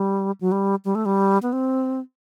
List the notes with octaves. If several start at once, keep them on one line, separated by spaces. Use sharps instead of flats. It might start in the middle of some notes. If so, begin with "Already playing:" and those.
Already playing: G3
F#3
G3
G3
A3
G3
B3
C4